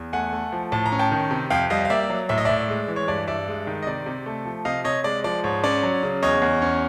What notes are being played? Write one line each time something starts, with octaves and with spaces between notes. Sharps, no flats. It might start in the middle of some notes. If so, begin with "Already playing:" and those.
Already playing: E2
A3 F#5 G#5
A3
F3
A2 A5
A#5
C#4
G5 A5
D#3
C3
F2 F5 G5
G3 D#5 F5
F5
A#3 D5 E5
F#3
A2 E5
D#5
A2 D5 E5
G#3
E3
C#5
G2 D5
G2 D5 E5
G#3
D#3
D#5
C3 D5
C3
A3
F3
C3 D#5 F5
C3 C#5 D#5
G#3 D5
F3 D5
G#2 C#5
C#4 D5
F#3
C#3
E2 C#5 D#5
E2
C#4